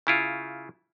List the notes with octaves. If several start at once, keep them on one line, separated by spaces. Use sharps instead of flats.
C#3 E4 F4